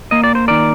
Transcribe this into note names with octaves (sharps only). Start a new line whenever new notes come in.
A#3 D#5
D5
C5
D#3 A#4 D5